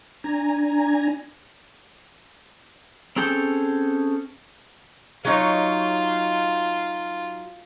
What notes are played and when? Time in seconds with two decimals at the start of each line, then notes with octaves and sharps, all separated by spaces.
0.24 D4 G#5 A#5
3.16 C4 C#4 G#4 A4 G5
5.25 F#3 D#4 F4 C#5